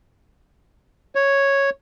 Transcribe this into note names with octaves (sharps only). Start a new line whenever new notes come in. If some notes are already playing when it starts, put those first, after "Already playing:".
C#5